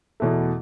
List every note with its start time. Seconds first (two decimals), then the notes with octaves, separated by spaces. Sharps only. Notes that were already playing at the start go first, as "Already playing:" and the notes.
0.20 E2 B2 A3